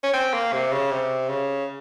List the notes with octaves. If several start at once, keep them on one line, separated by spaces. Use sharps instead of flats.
C#4
C4
A#3
C3
C#3
C3
C#3